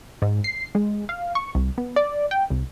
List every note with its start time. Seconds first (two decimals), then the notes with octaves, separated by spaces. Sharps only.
0.22 G#2
0.44 C7
0.75 G#3
1.09 F5
1.35 C#6
1.55 C2
1.78 B3
1.96 D5
2.31 G5
2.50 C2